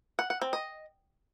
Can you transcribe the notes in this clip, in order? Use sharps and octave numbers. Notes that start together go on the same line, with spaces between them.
F#5
F#5
C4
D#5